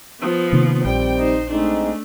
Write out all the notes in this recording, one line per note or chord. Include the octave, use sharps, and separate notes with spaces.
F3 B3
C3 D#3 A#3
A#1 D#3 G3 C4 G5
D#4 C5
G#3 A3 C4 D4 D#4